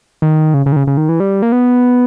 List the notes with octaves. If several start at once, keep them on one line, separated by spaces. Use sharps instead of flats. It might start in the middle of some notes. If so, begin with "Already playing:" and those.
D#3
C#3
C#3
D#3
C#3
C#3
D#3
E3
G3
A#3
B3